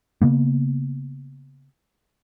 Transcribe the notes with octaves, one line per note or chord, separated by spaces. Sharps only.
C#3 A#3 B3